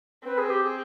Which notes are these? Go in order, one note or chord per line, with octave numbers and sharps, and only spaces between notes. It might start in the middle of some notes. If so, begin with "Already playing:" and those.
C4 B4
G#4
G4
G#4